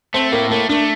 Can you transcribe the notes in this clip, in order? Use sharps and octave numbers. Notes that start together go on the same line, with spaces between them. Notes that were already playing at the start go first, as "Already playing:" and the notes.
A3 C4
A2 A#3
A3 A#3
A3 D4